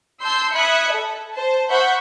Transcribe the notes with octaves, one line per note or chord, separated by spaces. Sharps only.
A5 C6 E6 G6 C7
E5 B5 D#6 F#6 G#6 C#7
A4
C5 A5
C5 E5 F#5 B5 C#6 G6